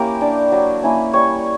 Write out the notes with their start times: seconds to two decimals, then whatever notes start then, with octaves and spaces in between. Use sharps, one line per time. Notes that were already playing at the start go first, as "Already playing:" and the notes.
Already playing: A#3 C#4 E4 G4 A#4
0.21 D4
0.52 F#3
0.83 A#3 C#4 E4
1.13 G3 C#5